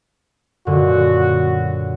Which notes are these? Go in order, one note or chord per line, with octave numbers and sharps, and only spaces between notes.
F#2 A#2 D3 F#4